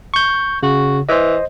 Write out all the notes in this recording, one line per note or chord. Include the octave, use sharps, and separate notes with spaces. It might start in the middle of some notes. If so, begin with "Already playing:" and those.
C#6 G6
C#3 F#4
E3 C5 D#5